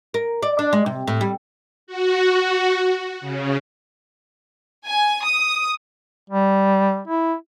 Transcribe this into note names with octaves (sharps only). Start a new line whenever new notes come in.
A#4
D5
D4
G#3
C3
A2
G3
F#4
C#3
G#5
D#6
G3
E4